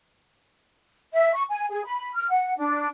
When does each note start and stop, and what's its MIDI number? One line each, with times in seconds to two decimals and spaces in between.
1.13 1.31 76
1.33 1.43 85
1.49 1.66 80
1.70 1.83 68
1.84 2.12 83
2.15 2.27 89
2.30 2.53 78
2.57 2.87 62